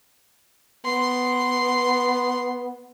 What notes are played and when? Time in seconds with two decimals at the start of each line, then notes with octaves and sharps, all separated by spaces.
0.85 B3 C6